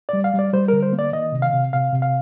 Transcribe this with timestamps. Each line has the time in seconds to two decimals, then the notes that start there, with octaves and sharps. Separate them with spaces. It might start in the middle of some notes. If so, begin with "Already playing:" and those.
0.09 G3 D5
0.24 F5
0.34 G3
0.39 D5
0.53 G3 C5
0.68 D3 A#4
0.83 C5
0.93 A#3
0.99 D5
1.13 D#3 D#5
1.32 C3
1.42 F5
1.53 C3
1.73 C3 F5
1.92 C3
2.02 F5